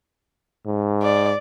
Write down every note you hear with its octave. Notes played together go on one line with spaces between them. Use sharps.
G#2
D5